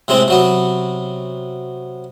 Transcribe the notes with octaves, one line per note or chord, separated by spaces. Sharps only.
A2 C3 G#3 C4
C3 F#3 B3